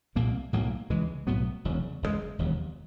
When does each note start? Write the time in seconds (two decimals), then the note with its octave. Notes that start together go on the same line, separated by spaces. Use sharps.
0.15 C2 A#2 F3 A#3
0.53 B1 A2 F#3 A#3
0.90 C#2 C#3 E3 G#3
1.27 B1 A2 F#3 B3
1.65 E1 E2 C#3 F#3
2.02 F#1 E2 B2 G#3
2.38 E1 D#2 C#3 F#3